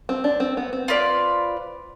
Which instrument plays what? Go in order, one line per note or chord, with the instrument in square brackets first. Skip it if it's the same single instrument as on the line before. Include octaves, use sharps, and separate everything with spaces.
[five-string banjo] C4
D4
C4
B3
C4
[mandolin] F4 B4 D5